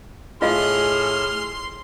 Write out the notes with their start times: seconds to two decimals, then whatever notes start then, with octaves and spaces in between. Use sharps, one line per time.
0.42 A2 F4 G#4 D#5 F5 C6 F6